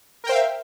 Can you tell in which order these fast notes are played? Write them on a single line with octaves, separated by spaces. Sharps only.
A#4 G5 C5 F5 E5